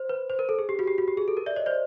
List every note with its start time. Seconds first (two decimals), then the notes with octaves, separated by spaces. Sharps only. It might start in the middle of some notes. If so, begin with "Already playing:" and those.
Already playing: C5
0.09 B4
0.30 C5
0.39 A#4
0.49 A4
0.59 G#4
0.69 G4
0.79 F#4
0.87 G4
0.98 F#4
1.08 G4
1.17 G#4
1.28 A4
1.37 A#4
1.46 D5 E5
1.56 C#5 D#5
1.66 C5 D5